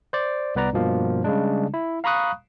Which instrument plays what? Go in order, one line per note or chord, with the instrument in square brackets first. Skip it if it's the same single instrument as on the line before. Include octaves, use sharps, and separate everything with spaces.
[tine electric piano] C5 D5
C2 B3 B4 D5 A#5
G2 B2 F3 A#3
C#3 G3 G#3 D4
E4
F5 A#5 B5 C#6 D#6 F#6